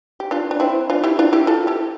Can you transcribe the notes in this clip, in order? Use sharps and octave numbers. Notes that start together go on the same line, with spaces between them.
G4
D4 F4
D4
C4 E4
D4 F4
E4 G4
D4 F4
E4 G4
F4 A4
E4 G4